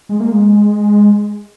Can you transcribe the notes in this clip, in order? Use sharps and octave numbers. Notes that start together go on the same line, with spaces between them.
G#3
A#3
G#3